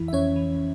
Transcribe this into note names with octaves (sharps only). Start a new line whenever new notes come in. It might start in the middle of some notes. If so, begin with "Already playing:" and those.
Already playing: F2 E3 E4
E5
F2 C#4 C#5
E3